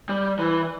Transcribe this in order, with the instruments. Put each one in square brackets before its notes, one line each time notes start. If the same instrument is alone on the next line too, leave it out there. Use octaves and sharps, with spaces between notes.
[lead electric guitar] G3
E3